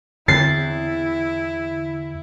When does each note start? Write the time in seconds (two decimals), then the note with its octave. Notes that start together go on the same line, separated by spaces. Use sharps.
0.28 E2 D3 E4 A6 C7